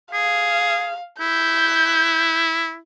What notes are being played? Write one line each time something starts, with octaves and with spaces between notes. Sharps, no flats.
G#4 F5
E4 G6